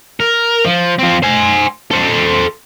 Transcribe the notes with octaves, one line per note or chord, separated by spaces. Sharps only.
A#4
F3
F3 C4
C5 G#5
A4 C5